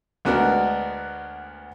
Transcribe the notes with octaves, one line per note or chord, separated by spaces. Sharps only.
D2 G#3 B3 D4 F#4 A#4